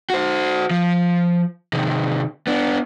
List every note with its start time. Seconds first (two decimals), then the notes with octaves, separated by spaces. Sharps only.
0.10 F#4 C5
0.71 F3
1.73 C3 D#3
2.47 B3 D4